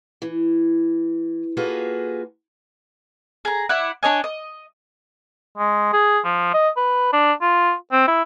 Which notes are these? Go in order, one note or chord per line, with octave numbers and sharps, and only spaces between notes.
E3
A#3 F4 F#4 G#4 A4 B4
G#4 A#5
E4 D5 F#5
D4 C#5 D#5 G#5
D#5
G#3
G#4
F3
D#5
B4
D4
F4
C4
E4